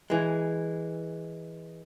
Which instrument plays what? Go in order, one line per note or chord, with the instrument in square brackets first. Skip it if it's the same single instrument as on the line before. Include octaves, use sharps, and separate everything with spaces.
[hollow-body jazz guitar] E3 G#3